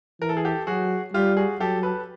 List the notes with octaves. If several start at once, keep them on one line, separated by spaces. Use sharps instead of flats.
E3 A#4
A4
G#4
G4 A4
F#3 F#4 G#4
G3 F4 G4
F#4 G#4
F#3 G4 A4
A4 B4